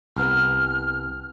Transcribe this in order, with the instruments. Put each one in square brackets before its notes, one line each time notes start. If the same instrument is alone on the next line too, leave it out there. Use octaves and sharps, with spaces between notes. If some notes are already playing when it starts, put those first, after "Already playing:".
[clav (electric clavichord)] C2 B3 [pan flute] F6